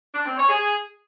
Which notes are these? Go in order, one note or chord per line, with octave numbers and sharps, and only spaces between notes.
D4
C4
C#5
G#4